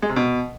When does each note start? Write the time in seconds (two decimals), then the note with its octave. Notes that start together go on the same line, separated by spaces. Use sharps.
0.02 G#3
0.09 C3
0.16 B2